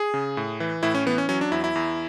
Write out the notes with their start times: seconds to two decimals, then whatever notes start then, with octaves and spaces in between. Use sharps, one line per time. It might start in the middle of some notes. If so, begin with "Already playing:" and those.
Already playing: G#4
0.14 C#3
0.37 A2
0.60 E3
0.83 A2 E4
0.95 C#4
1.06 E3 B3
1.18 C#4
1.29 F#3 C#4
1.41 D4
1.52 E2 E4
1.64 E4
1.75 E2